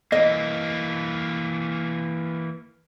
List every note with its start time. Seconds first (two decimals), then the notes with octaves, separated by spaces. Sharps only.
0.12 E3 A#3 D#5